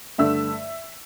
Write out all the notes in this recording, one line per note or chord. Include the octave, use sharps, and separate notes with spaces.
G2 D3 A3 D4 E5 E6